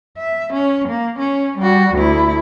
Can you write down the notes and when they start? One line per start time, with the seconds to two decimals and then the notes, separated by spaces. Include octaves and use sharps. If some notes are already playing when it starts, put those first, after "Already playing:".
0.17 E5
0.53 C#4
0.88 A#3
1.19 C#4
1.58 G3 F#4
1.95 D2 E4